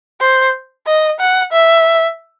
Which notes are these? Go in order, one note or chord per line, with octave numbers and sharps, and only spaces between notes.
C5
D#5
F#5
E5